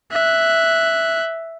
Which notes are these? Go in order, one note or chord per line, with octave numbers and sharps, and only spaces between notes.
E5 F#6